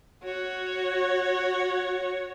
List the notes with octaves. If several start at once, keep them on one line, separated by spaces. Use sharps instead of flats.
F#4 C#5